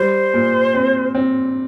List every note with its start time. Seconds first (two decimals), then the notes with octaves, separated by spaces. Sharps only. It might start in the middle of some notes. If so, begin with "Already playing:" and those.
Already playing: G3 C5
0.34 A#2
0.74 C4
1.15 C4